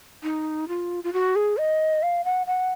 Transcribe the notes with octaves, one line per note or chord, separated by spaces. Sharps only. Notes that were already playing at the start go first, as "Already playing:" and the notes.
D#4
F4
F4
F#4
G#4
D#5
F5
F#5
F#5